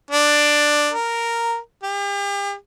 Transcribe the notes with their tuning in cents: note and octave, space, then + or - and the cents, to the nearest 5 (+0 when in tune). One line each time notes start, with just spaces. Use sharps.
D4 +10
A#4 -5
G4 +40